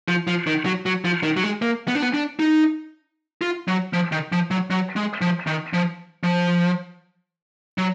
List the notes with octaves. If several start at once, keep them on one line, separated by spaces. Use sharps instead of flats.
F3
F3
D#3
F#3
F#3
F3
D#3
F#3
G#3
A#3
B3
D4
B3
D4
D#4
F4
F#3
F3
D#3
F3
F#3
F#3
G#3
F3
D#3
F3
F3
F#3